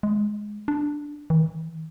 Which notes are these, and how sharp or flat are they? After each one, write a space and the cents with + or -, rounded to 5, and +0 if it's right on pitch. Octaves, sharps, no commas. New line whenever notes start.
G#3 +5
D4 +0
E3 -40